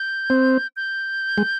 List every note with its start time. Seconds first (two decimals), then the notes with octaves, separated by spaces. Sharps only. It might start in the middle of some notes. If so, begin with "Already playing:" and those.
Already playing: G6
0.30 C4
0.76 G6
1.38 G#3